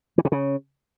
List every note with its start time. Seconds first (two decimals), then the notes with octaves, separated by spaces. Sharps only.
0.18 E3
0.25 C3
0.32 C#3